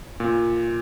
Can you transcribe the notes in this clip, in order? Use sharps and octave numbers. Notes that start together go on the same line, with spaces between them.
A#2